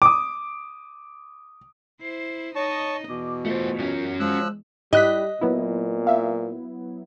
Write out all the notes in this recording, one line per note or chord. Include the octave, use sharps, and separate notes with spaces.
D6 D#6
E4 C5 C7
D#4 C#5 D#5 A5 C#6
E2 B2 D6
A3 F4 C5
F#3 C#4
F3 G#3 E6 F#6
G#2 G3 E4 G4 D#5 F#6 B6
A#2 F#3 B3 E4
E5 F5